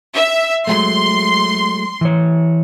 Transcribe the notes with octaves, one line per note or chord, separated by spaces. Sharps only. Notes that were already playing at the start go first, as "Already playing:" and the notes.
E5
F#3 G#3 A3 C6
E3 C#5